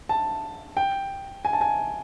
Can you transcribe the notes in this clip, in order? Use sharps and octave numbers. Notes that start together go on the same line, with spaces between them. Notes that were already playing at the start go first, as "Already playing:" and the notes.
A5
G5
G#5
A5
G#5